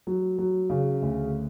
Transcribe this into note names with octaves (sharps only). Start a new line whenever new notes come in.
F#3
F#3
C#3
D2